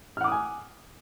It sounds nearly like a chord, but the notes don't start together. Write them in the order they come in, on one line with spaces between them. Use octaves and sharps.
F6 F#5 D6 D#6 G#5